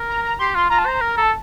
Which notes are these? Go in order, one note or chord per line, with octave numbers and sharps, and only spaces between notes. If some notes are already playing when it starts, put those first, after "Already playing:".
Already playing: A#4
A#5
A#5
G4 C6
F4 C6
F4 A#5
A5
C5 A#5
A#4
A4
A5